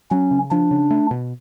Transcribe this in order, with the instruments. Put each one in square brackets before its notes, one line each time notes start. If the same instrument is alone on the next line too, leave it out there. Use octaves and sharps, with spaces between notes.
[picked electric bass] F#3 [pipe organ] C#4
[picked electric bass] C#3
[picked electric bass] F3 [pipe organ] D4
[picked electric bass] C#3
A3
B2